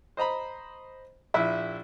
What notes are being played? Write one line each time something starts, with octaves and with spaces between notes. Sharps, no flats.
C5 D#5 A#5 B5
A#1 E4 E5